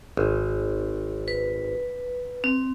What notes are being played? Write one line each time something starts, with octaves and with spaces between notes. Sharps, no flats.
G#1
B4
C4